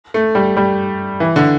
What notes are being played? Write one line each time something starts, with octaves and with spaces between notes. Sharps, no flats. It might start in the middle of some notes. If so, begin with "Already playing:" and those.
A3
G3
G3
E3
D3